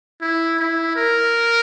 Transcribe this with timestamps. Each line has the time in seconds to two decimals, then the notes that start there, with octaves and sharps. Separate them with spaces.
0.21 E4
0.59 E4
0.96 A#4